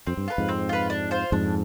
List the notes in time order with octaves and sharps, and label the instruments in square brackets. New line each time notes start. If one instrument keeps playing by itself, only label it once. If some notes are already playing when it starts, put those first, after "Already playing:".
[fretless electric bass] F2 [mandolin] C4
[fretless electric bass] G2
[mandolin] F4 B4
[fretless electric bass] F2 G#2
[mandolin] C4
F4 B4
D4
F4 C5
[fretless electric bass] F2 G#2 [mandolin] D4